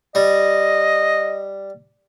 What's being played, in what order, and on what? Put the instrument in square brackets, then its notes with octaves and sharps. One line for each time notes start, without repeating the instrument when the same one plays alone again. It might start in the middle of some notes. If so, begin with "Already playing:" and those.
[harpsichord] G3 [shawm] D#5